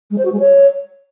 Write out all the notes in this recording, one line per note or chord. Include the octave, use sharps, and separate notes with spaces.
G#3
C5
F#4
G#3
C#5